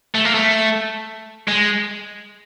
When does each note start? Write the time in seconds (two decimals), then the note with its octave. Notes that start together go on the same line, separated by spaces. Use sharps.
0.15 A3
0.25 A#3
0.34 A3
1.48 G#3